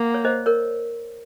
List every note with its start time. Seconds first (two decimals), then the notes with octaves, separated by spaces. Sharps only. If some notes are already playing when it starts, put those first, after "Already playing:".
Already playing: A#3 F#5
0.14 C#5
0.25 C5 D#5
0.46 A#4 C#5